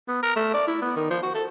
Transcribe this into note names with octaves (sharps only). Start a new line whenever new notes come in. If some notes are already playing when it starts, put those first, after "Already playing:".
B3
A#4
A3
D5
E4
B3
D#3
F3
F#4
A4